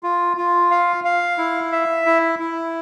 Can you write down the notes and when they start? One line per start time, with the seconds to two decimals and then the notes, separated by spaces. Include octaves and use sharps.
0.03 F4
0.37 F4
0.71 F5
1.04 F5
1.38 E4
1.72 E5
2.06 E4
2.39 E4